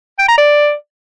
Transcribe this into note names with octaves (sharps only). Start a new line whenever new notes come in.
G5
A#5
D5